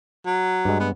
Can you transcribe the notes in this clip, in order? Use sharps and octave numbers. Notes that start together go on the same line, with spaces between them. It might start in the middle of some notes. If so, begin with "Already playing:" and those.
F#3
G2 G#3
B3